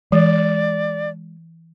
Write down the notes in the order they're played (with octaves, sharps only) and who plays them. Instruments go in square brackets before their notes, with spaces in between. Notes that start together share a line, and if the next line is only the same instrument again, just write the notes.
[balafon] E3 [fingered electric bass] G#3 [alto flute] D5